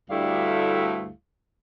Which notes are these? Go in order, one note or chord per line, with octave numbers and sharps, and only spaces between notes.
D2 G2 G3 A3 E4 F5